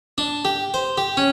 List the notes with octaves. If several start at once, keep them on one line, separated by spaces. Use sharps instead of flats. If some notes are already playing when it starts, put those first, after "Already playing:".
D4
G4
C5
G4
C#4